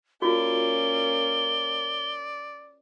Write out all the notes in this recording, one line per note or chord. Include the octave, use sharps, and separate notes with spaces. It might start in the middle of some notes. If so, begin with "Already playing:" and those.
A#3 C#4 F4 F#4 D5 G7